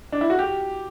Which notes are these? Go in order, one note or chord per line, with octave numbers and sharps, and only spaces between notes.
D4
E4
F#4
G4